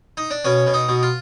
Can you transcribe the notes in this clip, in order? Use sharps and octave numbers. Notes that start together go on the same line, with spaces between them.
D#4
D4
B2 C#4
B2
D#4
B2
F4